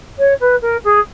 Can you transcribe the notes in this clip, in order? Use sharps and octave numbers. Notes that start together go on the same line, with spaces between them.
C#5
B4
A#4
G#4